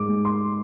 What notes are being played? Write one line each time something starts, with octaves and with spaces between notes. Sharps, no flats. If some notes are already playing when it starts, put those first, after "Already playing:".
Already playing: G#2 D6
G#3
C6